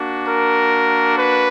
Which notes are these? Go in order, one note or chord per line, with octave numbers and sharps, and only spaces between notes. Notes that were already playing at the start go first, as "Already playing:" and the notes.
Already playing: A#3 D4 F#4
A#4
B4